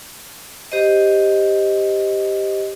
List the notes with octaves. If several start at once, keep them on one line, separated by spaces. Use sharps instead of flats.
G4 C5 D#5